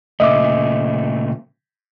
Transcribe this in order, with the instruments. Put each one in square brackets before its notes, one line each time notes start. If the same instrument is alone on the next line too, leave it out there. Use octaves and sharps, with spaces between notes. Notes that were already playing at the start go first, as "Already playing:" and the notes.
[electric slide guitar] A#2 C#3 A3 [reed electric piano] D#5 E5 D6